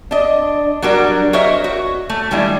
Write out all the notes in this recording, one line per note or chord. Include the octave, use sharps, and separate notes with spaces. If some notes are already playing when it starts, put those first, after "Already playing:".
D4 D#5
F#3 G3 D4 F#4 A#4
F#4 A#4 C5 C#5 D#5 E5
F#4
A3
D#3 G3 G#3 D4 E4